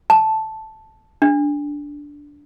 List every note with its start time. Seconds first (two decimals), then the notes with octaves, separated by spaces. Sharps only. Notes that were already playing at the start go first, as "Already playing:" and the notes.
0.10 A5
1.22 D4